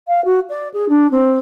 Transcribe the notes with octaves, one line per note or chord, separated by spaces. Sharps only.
F5
F#4
D5
G#4
D4
C4